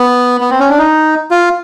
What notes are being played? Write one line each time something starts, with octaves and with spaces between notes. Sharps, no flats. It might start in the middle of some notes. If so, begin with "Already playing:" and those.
Already playing: B3
B3
C4
C#4
D4
D#4
F4